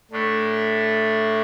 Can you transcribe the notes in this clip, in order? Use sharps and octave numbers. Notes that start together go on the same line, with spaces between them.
A2 A3 D4